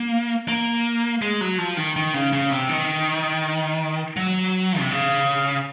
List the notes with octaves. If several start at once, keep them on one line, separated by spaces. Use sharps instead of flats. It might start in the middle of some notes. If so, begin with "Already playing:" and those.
Already playing: A#3
A#3
G#3
F#3
F3
D#3
D#3
C#3
C#3
C3
D#3
F#3
C3
C#3